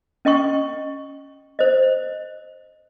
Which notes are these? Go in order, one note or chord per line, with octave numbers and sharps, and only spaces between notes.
C#4 D#5 G5 C#6
C5 D#5